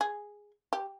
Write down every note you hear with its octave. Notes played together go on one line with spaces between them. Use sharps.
G#4
G4